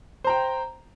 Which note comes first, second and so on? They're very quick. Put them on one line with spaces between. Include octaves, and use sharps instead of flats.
C5 A#5 G5